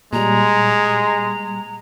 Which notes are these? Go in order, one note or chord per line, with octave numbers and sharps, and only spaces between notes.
A#2 G3 G#3 A#5